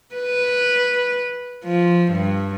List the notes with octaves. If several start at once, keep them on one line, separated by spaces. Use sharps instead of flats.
B4
F3
G2